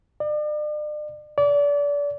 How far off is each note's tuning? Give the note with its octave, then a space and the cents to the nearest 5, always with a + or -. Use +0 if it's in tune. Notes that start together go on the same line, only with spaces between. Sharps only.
D5 +40
D5 -30